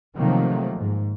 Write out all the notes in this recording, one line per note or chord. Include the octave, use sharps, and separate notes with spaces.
C3 D#3 F3 F#3 A3 A#3
G#2